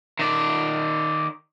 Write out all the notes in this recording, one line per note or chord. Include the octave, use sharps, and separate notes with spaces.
D#3 D5